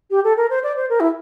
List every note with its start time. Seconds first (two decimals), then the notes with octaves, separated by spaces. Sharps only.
0.10 G4
0.24 A4
0.37 A#4
0.49 C5
0.63 D5
0.76 C5
0.89 A#4
1.00 E4